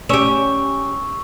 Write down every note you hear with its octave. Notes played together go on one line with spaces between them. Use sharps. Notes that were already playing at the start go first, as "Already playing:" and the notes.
C#4 G4 C#6 E6 E7